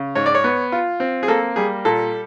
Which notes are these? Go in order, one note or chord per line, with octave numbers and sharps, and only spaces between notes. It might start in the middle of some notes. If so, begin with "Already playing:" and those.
Already playing: C#3
G#2 C#5
D5
C#5
B3
F4
C4
G#4
A#3 A4
G3 G#4
A#2 A4